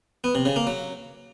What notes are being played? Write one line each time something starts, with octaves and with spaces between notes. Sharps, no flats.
B3
C3
C#3
A#3
F#3